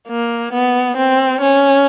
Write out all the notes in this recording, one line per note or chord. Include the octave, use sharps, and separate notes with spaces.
A#3
B3
C4
C#4